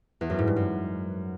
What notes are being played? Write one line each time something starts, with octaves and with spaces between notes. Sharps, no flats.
E2
F#2
G#2
G2
F#2